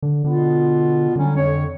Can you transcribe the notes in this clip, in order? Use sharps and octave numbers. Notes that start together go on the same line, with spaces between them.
D3
B2 D3 B3 F4
D3 F#3 G3 C#4
F2 C#5